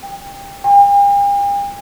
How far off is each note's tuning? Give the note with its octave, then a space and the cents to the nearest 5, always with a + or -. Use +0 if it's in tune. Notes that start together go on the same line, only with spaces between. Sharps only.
G5 +20
G5 +45